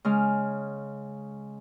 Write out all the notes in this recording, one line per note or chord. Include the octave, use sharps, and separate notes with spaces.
C#3 G#3 F6